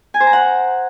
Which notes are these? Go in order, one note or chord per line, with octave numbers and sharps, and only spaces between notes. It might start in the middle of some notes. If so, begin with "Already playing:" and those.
G#5
C5
A#5
F#5